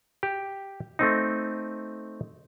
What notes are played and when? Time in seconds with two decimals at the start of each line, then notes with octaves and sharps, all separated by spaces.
0.23 G4
0.99 A3 C4 D#4